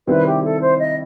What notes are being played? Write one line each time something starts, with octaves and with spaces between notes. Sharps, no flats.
C3 D#3 G3 C4 E4 B4
G4
A4
C5
D#5